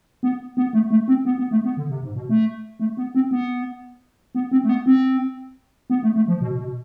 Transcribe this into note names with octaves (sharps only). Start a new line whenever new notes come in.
B3
B3
A3
A3
C4
B3
B3
A3
B3
D3
C3
G#2
B2
A3
A3
B3
C4
B3
B3
C4
A3
B3
C4
B3
A3
A3
F3
B2
B2